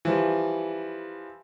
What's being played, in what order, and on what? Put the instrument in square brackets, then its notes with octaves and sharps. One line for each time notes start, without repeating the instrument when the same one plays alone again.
[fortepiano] E3 F3 G3